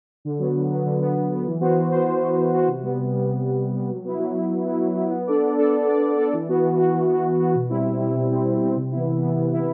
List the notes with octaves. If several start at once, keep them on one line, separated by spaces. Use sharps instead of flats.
D3
F#3 B3
D3
F#3 B3
D3
F#3 B3
D3
F#3 B3
E3
B3 F#4 C5
E3
B3 F#4 C5
E3
B3 F#4 C5
E3
B3 F#4 C5
C3
G3 B3
C3
G3 B3
C3
G3 B3
C3
G3 B3
F#3
B3 E4
F#3
B3 E4
F#3
B3 E4
F#3
B3 E4
B3
D4 A4 D5
B3
D4 A4 D5
B3
D4 A4 D5
B3
D4 A4 D5
E3
B3 F#4
E3
B3 F#4
E3
B3 F#4
E3
B3 F#4
B2
G3 C4 E4
B2
G3 C4 E4
B2
G3 C4 E4
B2
G3 C4 E4
C3
E3 B3 E4
C3
E3 B3 E4
C3
E3 B3 E4